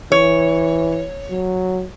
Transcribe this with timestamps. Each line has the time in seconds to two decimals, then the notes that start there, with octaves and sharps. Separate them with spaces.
0.12 E3 C#5
1.30 F#3